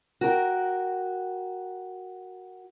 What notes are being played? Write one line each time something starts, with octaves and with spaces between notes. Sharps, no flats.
F#4 A#4 G5